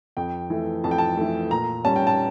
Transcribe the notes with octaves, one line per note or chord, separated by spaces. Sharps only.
F2 G5
E3 A3
F2 A5
G5
A5
E3 A3
A#2 A#5
G3 C#4 A5
G5
A5